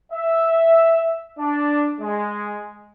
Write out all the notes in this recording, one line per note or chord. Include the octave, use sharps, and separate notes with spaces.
E5
D4
G#3